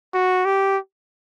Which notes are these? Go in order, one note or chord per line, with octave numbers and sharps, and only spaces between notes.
F#4
G4